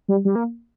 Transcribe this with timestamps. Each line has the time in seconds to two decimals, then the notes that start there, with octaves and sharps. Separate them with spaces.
0.08 G3
0.25 G3
0.35 A#3